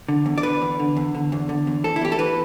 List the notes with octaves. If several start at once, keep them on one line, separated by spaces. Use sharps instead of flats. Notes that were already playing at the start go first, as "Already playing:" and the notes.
D3
E2
D5
D3 B4
E2
D3
E2
D3
E2
D3
E2
E3 A4
E4
E2 G4
A4
E3 B4